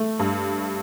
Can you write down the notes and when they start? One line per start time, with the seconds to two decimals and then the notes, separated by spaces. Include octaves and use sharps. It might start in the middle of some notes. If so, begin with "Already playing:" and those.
Already playing: A3
0.19 G2